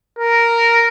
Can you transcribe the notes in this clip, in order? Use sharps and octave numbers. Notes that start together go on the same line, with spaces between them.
A#4